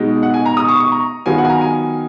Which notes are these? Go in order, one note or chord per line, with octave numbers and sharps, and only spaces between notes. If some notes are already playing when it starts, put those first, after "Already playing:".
Already playing: B2 G#3 D#4
F#5
G#5
A#5
D#6
C#6
C#6
A#5
D#3 F#3 B3 F4 G#5
F#5
G#5
A#5
G#5